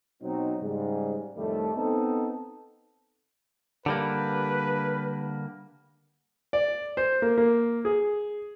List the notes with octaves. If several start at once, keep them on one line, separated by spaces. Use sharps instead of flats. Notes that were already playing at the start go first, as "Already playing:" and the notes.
B2 F#3 C4 D#4
G#2 C#3 G3
F2 A2 C3 D#3 G3 A3
B3 C4 D#4 A4
D3 G3 A#3 B4
D5
C5
A#3
A#3
G#4